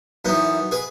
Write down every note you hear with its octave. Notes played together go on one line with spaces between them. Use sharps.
F#2 E3 B3 D#4
G#4 B4